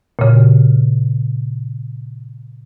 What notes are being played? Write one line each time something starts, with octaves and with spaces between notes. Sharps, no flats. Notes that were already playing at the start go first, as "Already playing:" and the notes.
A#2 C#3